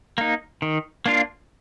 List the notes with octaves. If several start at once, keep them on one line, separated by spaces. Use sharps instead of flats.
A#3 D#4
D#3
A#3 D4 F4